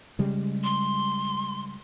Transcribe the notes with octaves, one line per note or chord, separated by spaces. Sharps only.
C#3 G3 G#3
C6